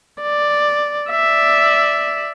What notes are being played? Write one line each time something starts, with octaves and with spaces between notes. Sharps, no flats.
D5
D5 E5